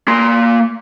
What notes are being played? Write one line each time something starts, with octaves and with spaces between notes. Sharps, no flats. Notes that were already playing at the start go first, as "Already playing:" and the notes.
A#3 C6